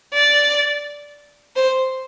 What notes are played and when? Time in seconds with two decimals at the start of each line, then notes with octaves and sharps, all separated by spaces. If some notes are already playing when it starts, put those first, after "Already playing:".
0.14 D5
1.56 C5